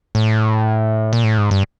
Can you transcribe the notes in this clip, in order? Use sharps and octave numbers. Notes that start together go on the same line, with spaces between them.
A2
A#2
A2
G#2
G2